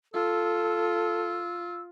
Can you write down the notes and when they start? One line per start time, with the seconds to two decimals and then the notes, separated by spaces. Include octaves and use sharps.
0.14 F4 A4 E6